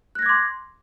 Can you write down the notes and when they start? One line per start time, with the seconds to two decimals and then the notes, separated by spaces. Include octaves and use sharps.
0.15 F#6
0.19 A#6
0.22 G#6
0.26 D6
0.29 C6